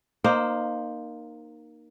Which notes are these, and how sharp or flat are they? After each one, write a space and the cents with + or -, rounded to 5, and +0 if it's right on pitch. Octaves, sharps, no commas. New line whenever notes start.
A#3 +10 D#4 -20 C5 +0